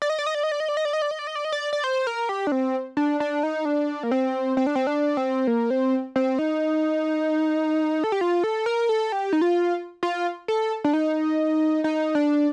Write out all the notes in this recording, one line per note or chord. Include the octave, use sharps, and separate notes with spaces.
D5
D#5
D5
D#5
D5
D#5
D5
D#5
D5
D#5
D5
D#5
D5
D#5
D5
D#5
D5
D#5
D5
D5
C5
A#4
G4
D4
C4
D4
D4
D#4
D4
A#3
C4
C4
D4
C4
D4
C4
A#3
C4
C4
D#4
A4
G4
F4
A4
A#4
A4
G4
D#4
F4
F4
A4
D4
D#4
D#4
D4